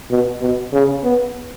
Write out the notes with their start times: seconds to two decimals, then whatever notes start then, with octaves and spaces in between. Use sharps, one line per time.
0.10 B2
0.42 B2
0.73 C#3
1.04 B3